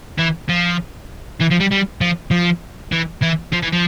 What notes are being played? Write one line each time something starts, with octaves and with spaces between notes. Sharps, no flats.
E3
F3
E3
F3
G3
G3
F3
F3
E3
E3
F3
E3
F3